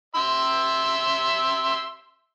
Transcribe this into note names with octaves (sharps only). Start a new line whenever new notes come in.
E5 C6 E6